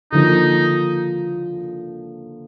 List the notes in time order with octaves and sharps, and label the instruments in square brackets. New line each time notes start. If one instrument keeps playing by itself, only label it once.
[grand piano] D3 F3 A#3 [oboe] D#4